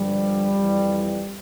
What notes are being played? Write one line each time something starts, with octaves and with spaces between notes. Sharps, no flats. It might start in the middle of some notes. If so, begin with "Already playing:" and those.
Already playing: G2 D3 F3 G3
F2
E3